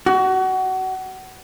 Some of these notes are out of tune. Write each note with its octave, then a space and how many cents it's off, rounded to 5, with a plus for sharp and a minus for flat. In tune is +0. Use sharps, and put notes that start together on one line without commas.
F#4 +25